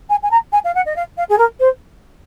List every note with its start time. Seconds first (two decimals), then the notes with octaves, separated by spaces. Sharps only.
0.10 G#5
0.23 G#5
0.31 A#5
0.52 G#5
0.65 F5
0.75 F#5
0.86 D#5
0.96 F5
1.18 F5
1.29 G#4
1.38 A#4
1.60 C5